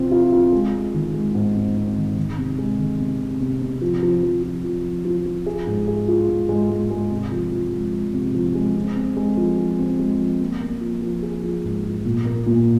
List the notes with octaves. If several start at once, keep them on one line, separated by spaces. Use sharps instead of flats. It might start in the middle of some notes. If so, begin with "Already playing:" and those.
Already playing: C3 F3 C4 F4
F4
F4
G#3
G#3
D#3
G#3
G#2
C4
C4
D#3
D#3
C3
G#3
D#3
C3
C3
C3
C3
F3
F3
F3
F3
F3
F3
F3
F3
G#4
G#2
G#4
F4
G#2
G#3
G#3
G#3
C3
F3
F3
G#3
G#3
C3
F3
G#3
C4
C4
G#3
F3
F3
C4
G#3
F3
A#3
A#3
F3
F3
G#4
F3
G#2
F3
A#2
A#3
A#2